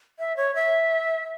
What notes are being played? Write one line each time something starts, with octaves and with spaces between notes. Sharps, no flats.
E5
C#5
E5